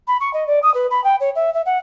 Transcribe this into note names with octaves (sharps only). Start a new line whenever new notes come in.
B5
C#6
D#5
D5
D#6
B4
B5
G5
C#5
E5
E5
F#5